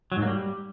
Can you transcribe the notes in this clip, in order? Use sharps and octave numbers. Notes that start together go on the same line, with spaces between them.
F#3
G#2
A#3
G3